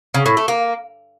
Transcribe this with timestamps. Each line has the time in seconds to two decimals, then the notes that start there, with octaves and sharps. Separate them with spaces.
0.14 C#3
0.26 A2
0.37 A3
0.48 A#3